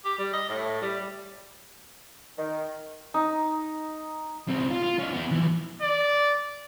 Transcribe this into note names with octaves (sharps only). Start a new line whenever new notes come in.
G4
G3
D#5
A2
G3
D#3
D#4
C#2 C4
F4
F4
C#4 D#4
B3 E4
E3 F3
D5